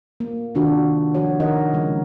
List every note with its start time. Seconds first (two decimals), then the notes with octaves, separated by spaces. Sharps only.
0.20 A#3
0.55 C3 D#3 D4 F4 F#4
1.14 F3 F#4 C#5
1.40 D#3 D#4 A#4 D#5 F#5
1.73 C#3 F3 G#3